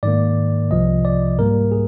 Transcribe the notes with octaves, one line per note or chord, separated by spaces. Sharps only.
G#2 D#3 A#3 D5
C2 C3 F3 D#5
D5
G#2 G3 A#3 A#4
G#4